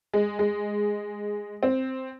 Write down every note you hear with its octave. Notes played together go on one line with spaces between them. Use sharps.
G#3
G#3
C4